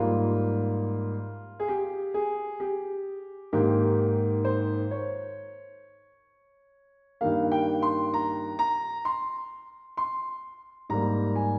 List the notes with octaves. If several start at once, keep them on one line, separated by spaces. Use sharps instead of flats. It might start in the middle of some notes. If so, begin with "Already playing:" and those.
Already playing: G#2 G3 A#3 F4
G#4
G4
G#4
G4
G#2 D#3 A#3 G4
C5
C#5
G2 D#3 A#3 F5
G5
C6
A#5
A#5
C6
C6
G#2 G3 A#3 A#5
G#5